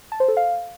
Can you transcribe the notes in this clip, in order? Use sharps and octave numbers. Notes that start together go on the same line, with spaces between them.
A5
C5
A4
F5